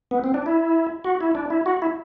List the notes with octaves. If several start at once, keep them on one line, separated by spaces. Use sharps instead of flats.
B3
C4
D4
E4
F#4
E4
D4
E4
F#4
E4